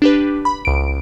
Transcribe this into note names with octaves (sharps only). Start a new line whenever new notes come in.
D4 G4 B4
B5
C#2 D7